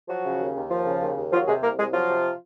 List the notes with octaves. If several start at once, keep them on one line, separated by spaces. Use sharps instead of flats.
F3 F#3 F#4
C#3
D#2
D#2
F3
C#3
D#2
D#2
F3 F#3 F4
C3 G#3 G#4
C2 A#3 A#4
C2 G#3 G#4
F3 F#3 F4
C3